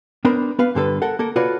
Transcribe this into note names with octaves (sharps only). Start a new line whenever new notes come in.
B3 D4 A#4 C5 B5
B3 B4 F5
G2 D3 A4 B4
A4 A#4 F#5
A#3 A4 A#4
F4 F#4 A4 B4 C#5 D5